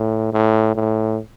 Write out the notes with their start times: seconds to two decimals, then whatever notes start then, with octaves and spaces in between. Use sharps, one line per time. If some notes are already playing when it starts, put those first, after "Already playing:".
Already playing: A2
0.33 A2
0.75 A2